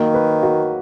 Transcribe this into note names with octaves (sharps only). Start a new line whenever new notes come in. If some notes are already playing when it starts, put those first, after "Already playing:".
Already playing: D#3 F#3 A#3
B4
F#4